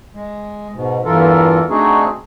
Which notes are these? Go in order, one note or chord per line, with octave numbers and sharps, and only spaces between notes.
G#3
G#2 B2
E2 G2 E3 F4 A4 A#4
A3 C4 D4 D#4 F#4 G#4